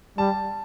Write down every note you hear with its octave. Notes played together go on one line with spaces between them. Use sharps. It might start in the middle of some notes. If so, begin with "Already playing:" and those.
G3 A5